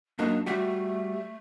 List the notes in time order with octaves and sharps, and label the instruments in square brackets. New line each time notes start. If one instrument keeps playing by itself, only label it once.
[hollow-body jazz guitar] F#2 A#3 D#4 [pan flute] D4
[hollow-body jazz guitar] G3 F#4 [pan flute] A3